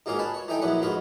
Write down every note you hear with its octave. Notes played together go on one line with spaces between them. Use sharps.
G#2 B2 A#3 C#4 F4 G#4
B4 G#5 A5
C#5
E3 A3 D#4 G5 G#5
A#1 F#2 E3 F#3 B3 B4
F2 G#2 F4 F#4 B4